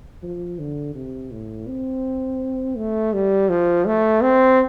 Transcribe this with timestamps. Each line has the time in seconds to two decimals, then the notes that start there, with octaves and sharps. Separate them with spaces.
0.23 F3
0.59 D3
0.95 C3
1.31 A2
1.67 C4
2.77 A3
3.14 G3
3.49 F3
3.87 A3
4.22 C4